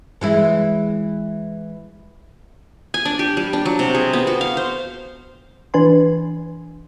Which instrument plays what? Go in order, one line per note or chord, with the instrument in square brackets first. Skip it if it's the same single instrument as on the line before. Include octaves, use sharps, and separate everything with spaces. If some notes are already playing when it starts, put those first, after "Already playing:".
[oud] E3 G#3 E4
[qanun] G#5
D4
G4
G3
D4
F#3
C3
G#4
B3
F#4
F5
C5
[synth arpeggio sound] E3 D4 B4 G#5 C6